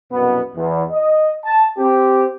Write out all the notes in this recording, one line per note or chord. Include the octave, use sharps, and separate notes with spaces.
C2 F#2 B2 B3
E2
D#5
A5
C4 G4